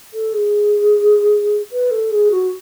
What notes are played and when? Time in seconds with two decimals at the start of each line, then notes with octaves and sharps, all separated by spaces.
0.14 A4
0.33 G#4
1.72 B4
1.91 A4
2.11 G#4
2.31 F#4